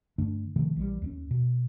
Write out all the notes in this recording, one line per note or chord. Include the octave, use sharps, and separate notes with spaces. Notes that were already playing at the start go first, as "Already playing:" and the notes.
G2 D3 A3 D4
C3 D#3 F3 A3
A#1 E3 F3 G3
D#2 G#3 C#4
B2